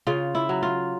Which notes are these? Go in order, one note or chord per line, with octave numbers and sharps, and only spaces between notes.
C#3 F4
E4
F#3
F4